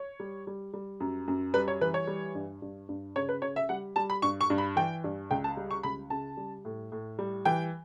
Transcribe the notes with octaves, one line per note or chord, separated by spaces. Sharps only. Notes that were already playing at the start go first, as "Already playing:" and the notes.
Already playing: C#5
G3
G3
G3
F#2
F#2
G3 B4
C#5
E3 B4
C#5
G3
G2
G2
G2
C#3 C#5
B4
C#3 C#5
E5
G3 F#5
G3 A5
B5
G2 C#6
C#6
G2
B5
E3 G5
G2
C#2 G5
A5
G3
C#6
C#2 B5
C#3 A5
G3
A2
A2
G3
E3 G5